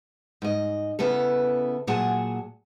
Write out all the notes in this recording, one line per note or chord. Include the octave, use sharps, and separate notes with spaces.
G#2 D#5
C#3 B3 E4 A4
A#2 F#3 G#4 F#5 G#5 A5